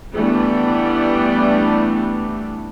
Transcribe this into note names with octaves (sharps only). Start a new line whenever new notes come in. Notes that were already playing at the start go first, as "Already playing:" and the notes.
E3 G3 A3 B3 D4